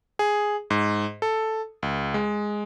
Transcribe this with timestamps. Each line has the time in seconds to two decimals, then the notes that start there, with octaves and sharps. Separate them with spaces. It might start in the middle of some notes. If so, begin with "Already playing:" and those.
0.19 G#4
0.70 G#2
1.22 A4
1.83 C#2
2.14 G#3